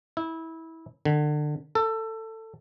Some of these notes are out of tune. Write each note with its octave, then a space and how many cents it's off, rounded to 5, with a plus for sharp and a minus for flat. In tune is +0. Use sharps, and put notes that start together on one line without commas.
E4 -20
D3 +30
A4 +20